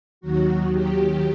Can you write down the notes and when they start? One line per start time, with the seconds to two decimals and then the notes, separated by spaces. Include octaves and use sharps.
0.21 D#2 D#3 F#3 F#4
0.72 G4